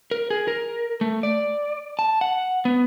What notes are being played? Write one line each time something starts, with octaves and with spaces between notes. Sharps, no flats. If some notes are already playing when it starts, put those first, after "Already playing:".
A#4
G#4
A#4
A3
D5
A5
F#5
B3